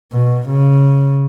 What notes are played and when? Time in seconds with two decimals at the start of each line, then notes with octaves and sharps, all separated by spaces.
0.12 B2
0.49 C#3